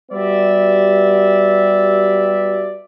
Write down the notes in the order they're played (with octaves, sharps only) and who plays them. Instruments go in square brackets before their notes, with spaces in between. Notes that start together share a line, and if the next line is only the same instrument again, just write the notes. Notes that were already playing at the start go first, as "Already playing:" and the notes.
[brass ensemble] G3 B3 F#4 G4 D5 E5